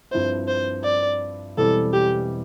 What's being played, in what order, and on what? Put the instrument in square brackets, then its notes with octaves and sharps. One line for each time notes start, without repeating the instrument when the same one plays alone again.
[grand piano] G2 F3 C4 E4 [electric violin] C5
[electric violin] C5
D5
[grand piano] E1 E2 E3 G3 C4 [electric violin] A4
[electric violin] G4